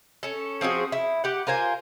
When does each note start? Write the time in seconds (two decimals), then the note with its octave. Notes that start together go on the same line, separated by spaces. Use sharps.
0.23 C#4 A4
0.61 F3 C4 F#4 G#4
0.92 E4
1.24 G4 F#5
1.47 F4 A#4 C5 G#5